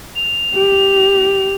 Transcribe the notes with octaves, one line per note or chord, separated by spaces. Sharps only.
F7
G4